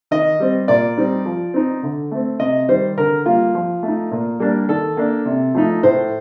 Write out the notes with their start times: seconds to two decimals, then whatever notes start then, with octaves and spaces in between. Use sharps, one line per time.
0.11 D#3 D#5
0.40 G3 C4
0.68 A#2 D5
0.97 G3 C4 D#4
1.26 F3
1.54 C4 D#4
1.83 D3
2.11 A3 C4
2.40 C3 D#5
2.69 D#3 G3 C5
2.97 D3 A#4
3.26 G3 A#3 F4
3.55 F3
3.83 A3
3.88 D#4
4.11 A#2
4.40 G3 A#3 D4
4.69 D#3 A4
4.97 A#3 D4
5.26 C3
5.54 F3 A3 D#4
5.83 A2 C5